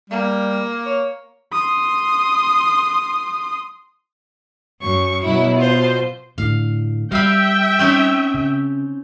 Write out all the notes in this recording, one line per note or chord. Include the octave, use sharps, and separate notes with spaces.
G3 A#3
C#5
C6 D#6
F#2 C#6
B2 F#3 E4
F4 C5
A2 D3 F5
G3 E5 F5 G5 B5
C4 C#4 D#4
C#3